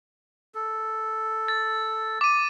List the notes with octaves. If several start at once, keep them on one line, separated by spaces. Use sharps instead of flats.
A4
A6
D6 D#7